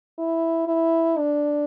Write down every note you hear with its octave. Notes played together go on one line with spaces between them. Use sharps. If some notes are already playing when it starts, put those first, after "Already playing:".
E4
E4
D4